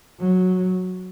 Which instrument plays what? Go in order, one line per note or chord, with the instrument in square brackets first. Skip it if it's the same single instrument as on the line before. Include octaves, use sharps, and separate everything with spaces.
[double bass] F#3